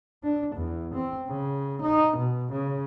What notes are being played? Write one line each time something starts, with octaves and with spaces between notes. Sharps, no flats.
D4
E2
C4
C#3
D#4
B2
C#3